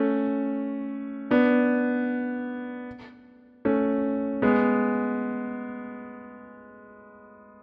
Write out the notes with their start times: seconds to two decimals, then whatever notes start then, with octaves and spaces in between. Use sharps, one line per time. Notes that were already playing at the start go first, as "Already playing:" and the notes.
Already playing: A3 C#4
1.31 B3 D4
3.65 A3 C#4
4.42 G#3 B3